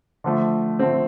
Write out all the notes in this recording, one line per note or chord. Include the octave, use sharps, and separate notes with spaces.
D3 F3 A3
D3 F3 A3 C4